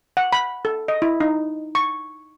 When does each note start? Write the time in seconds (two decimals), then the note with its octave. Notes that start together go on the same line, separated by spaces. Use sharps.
0.17 F#5
0.33 B5
0.65 A4
0.88 D#5
1.02 E4
1.20 D#4
1.75 C#6